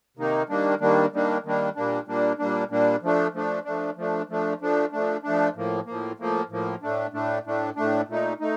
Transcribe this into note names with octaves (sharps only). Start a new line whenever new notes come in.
C3 D#3 A#3 D#4
D#3 G3 A#3 D4
D#3 G3 A#3 D4
D#3 G3 A#3 D4
D#3 G3 A#3 D4
A#2 G3 A#3 D4
A#2 G3 A#3 D4
A#2 G3 A#3 D4
A#2 G3 A#3 D4
F3 A3 D4
F3 A3 D4
F3 A3 D4
F3 A3 D4
F3 A3 D4
F3 A3 D4
F3 A3 D4
F3 A3 D4
A2 F3 A#3
A2 F3 A#3
A2 F3 A#3
A2 F3 A#3
A2 A3 D4
A2 A3 D4
A2 A3 D4
A2 A3 D4
A#2 A3 D#4
A3 D#4